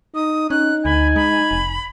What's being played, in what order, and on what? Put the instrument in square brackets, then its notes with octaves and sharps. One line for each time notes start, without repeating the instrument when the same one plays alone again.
[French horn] D#4 [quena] D#6
[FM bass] C#4 [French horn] D#4 [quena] F#6
[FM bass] D2 [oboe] G#5 [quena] B5
[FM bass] G#3 [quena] B5
[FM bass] F1